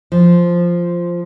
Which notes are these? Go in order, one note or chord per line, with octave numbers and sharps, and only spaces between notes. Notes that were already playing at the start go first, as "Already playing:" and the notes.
F3